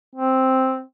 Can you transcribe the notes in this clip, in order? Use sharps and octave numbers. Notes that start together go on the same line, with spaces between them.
C4